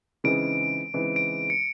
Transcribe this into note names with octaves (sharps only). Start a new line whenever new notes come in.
C#3 E3 G#3 C4 D#4 D7
C#3 E3 G#3 C4 D#4
D7
C#7